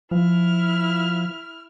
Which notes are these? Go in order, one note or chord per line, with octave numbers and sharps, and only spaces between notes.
F3 E4 F6